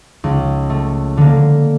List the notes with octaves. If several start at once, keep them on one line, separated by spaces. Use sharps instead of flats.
C#2
A3
D3 A#3